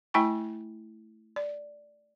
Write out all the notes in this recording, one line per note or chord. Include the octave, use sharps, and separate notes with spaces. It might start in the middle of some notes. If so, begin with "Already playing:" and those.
A3 E4 G5 G#5 C#6
D5